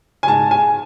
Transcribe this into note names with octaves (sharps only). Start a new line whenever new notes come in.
G#5
G#2 A5
G#5